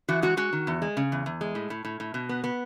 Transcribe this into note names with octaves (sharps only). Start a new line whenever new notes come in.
E3 F#4
G#3 F#4
G#3 F#4
D#3
E2
G#3
C#3
E2
E2
G#3
A2
A2
A2
A2
B2
B3
B3